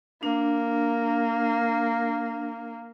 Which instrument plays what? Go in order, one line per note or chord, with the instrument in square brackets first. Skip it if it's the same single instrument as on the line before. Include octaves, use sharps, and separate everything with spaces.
[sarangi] A#3 [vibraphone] D4